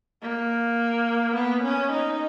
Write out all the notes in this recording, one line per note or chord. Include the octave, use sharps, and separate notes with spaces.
A#3
B3
C#4
D#4